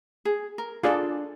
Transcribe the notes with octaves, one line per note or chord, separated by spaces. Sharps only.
G#4
A#4
D4 F4 G#4 A4 D5